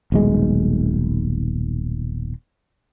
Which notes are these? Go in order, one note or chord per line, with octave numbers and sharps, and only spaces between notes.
D#1 B1 G#3